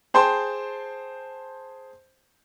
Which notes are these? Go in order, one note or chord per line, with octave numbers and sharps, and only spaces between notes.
G#4 C5 G5 A5 C6